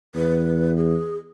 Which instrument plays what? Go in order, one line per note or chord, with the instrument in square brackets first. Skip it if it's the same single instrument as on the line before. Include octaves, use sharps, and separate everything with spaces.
[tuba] E2 [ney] B4
[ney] G#4